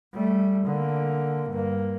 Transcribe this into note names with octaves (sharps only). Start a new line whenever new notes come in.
G3 A3
D3 A#3
G2 A#3